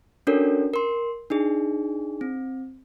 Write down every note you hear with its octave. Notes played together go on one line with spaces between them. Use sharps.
C#4 D4 F#4 A4 A#4 C#5
A#4 C6
D4 D#4 G#4
C4